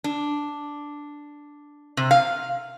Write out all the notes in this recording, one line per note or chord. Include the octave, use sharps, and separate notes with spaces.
D4
C3
F5